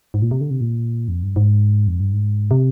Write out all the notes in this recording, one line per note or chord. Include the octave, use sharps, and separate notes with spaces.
G#2
A#2
C3
D3
C3
A#2
F2
G2
G#2
F2
G2
G#2
C3